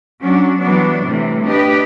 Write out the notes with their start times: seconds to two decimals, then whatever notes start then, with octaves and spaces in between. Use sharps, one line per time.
0.21 F#3 C#4 D4
0.60 E3 F#3 G3 B3 D4
1.05 A2 C3 E3 G3
1.46 D4 G4 B4 D#5